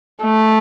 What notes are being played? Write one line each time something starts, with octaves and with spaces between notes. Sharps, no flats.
A3